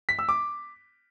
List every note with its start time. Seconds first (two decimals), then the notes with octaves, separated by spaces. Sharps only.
0.09 B6
0.19 E6
0.29 D6